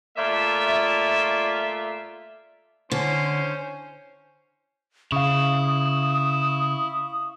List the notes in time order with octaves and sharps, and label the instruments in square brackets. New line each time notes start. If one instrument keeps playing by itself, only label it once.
[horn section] A#2 A3 F4 D5 E5
[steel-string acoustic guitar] D3 [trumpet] C#4 [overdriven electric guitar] C5
[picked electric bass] C#3 [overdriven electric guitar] E4 [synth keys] F5 C#6 [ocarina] D#6